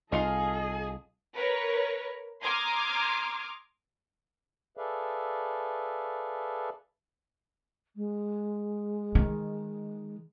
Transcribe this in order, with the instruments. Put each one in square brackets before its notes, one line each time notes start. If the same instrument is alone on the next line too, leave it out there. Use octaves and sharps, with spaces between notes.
[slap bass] C2 [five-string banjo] D#4 F4 F5 [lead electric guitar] G#4 [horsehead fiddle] A4 D#5
[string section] A#4 B4 C#5
A#5 C6 D6 D#6 F6 G#6
[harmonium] G#4 A4 B4 D5 E5 F5
[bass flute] G#3
[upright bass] D#3